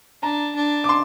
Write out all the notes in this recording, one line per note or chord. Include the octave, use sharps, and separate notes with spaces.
D4 A#5
D4
D6
C6